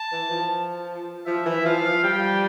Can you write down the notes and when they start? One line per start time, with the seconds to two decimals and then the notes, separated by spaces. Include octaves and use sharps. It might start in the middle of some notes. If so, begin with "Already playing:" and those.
Already playing: A5
0.12 E3
0.31 F3
1.27 F3 E5
1.46 E3
1.65 F3 F5
1.84 F3
2.03 G3 G5